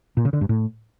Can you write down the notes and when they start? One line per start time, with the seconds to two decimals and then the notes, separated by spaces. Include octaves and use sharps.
0.17 A#2
0.25 C#3
0.33 D3
0.41 G2
0.49 A2